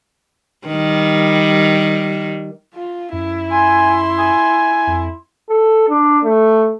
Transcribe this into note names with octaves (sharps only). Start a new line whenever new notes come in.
D#3 G3
F4
F#2 E4
G#5 C6
G#5
F2
A4
D4
A3